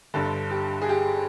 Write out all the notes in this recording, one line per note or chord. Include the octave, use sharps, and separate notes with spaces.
G1 G2 D3 A4
G4
G#4
G4